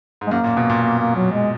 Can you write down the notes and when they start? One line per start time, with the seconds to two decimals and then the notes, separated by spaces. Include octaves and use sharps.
0.21 G#2
0.27 G#3
0.31 F#2 A#3
0.44 A#2
0.57 B2
0.69 A#2
0.82 A#3
0.99 A#3
1.16 F#3
1.32 G#3